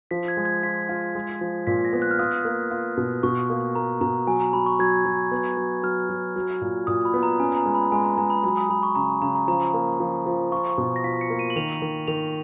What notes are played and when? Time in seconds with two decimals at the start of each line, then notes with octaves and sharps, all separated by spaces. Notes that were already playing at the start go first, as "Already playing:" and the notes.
0.11 F3 B6
0.28 G#6
0.37 G#3
0.45 G#6
0.63 F4 B6
0.89 F4
1.15 G#3
1.41 F3
1.67 A#2 B6
1.85 A#6
1.93 B3
2.02 F#6
2.11 F6
2.19 F4 D#6
2.45 A#3
2.71 F4
2.97 B2
3.23 B2 C#6
3.50 A#3
3.75 A#3 A#5
4.01 B2 A#5
4.27 F#3 G#5
4.40 A#5
4.53 F#3 B5
4.66 C#6
4.79 F#3 G#6
5.06 F#3
5.32 B3
5.57 F#3
5.83 F#3 F6
6.10 F#3
6.36 F#3
6.62 A#2
6.87 A#2 D#6
7.05 B5
7.14 B3
7.23 A#5
7.40 C#4 G#5
7.57 A#5
7.66 G#3
7.75 B5
7.92 G#3 G#5
8.04 A#5
8.18 G#3 A#5
8.30 B5
8.44 F#3 B5
8.57 D#6
8.70 F#3 B5
8.83 C#6
8.95 C#3 A#5
9.22 C#3 A#5
9.35 A#5
9.48 F3 A#5
9.74 A#3
10.00 F3
10.26 F3
10.52 F4 C#6
10.69 C#6
10.78 B2
10.96 A#6
11.04 F4 B6
11.21 C#7
11.30 A#3
11.39 D#7
11.50 F#7
11.56 D#3 F7
11.82 D#3
12.08 D#3 F7